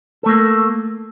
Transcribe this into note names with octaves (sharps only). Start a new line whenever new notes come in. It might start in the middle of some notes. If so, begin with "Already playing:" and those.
A3 A#3 A4